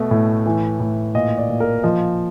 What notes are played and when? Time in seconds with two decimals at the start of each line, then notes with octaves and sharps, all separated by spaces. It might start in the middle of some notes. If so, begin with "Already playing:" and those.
Already playing: B2 A3
0.11 A2
0.46 E3
0.80 A2
1.15 A#2 D#5
1.38 D5
1.49 A#2
1.60 A#4
1.84 F3 D#5